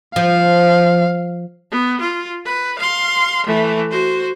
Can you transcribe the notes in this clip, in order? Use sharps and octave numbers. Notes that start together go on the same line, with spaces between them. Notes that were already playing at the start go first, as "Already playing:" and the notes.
F3 F5
B3
F4
B4
F5 C6
E3 A3
F#4 C5